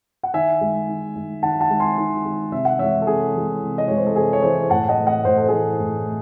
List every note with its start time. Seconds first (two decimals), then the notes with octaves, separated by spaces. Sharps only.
0.23 F#5
0.34 D#3 E5 G#5
0.61 G#3
0.89 D#3
1.16 G#3
1.43 D#3 F#5 A5
1.61 F#5 A5
1.70 G#3
1.80 G#5 C6
1.98 D#3
2.25 G#3
2.52 C3 E5
2.65 F#5
2.79 E3 G#3 C#5 E5
3.02 A4
3.07 C3 G#4
3.34 E3 G#3
3.62 C3
3.78 D#5
3.88 E3 G#3 C#5
3.97 C5
4.06 A4
4.16 C3 G#4
4.33 C#5
4.43 E3 G#3 G#4 C5
4.70 A2 F#5 A5
4.89 D#5 F#5
4.98 E3 A3
5.07 D#5 F#5
5.24 A2 C5
5.37 A4
5.48 E3 A3 G#4 C5
5.80 A2
6.07 A3